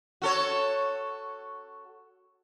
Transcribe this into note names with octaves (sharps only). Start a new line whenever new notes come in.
F#4 A4 C#5